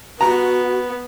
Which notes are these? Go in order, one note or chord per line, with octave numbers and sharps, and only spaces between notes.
B3 F#4 A#5